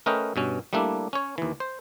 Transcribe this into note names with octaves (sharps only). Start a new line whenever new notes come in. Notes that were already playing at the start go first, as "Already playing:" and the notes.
A3 C#4 A#4 B4 D#5 G5
G2 B2 C#4
G3 A3 A#3 D4 E4
C#4 C#5
D#2 E3
C5